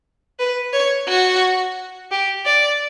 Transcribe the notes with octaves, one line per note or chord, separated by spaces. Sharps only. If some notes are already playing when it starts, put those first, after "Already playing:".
B4
C#5
F#4
G4
D5